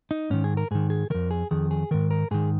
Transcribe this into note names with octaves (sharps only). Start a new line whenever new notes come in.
D#4
G#2 D#3 C#4
G#4
A#4
G#2 D#3 G#4
G#4
F2 D#3 A#4
G#4
F2 D#3 G#4
G#4
G#2 D#3 A#4
A#4
G#2 D#3 G#4